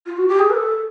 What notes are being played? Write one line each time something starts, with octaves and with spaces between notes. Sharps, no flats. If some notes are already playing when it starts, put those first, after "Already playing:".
F4
F#4
G4
G#4
B4
A4